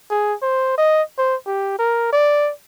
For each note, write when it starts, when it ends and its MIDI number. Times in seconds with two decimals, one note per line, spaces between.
0.10 0.34 68
0.42 0.78 72
0.78 1.02 75
1.18 1.36 72
1.47 1.76 67
1.79 2.08 70
2.13 2.51 74